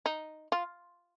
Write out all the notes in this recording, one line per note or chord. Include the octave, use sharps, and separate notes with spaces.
D#4
F4